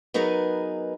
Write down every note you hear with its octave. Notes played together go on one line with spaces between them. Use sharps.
F#3 B3 D#4 G#4 A#4 B4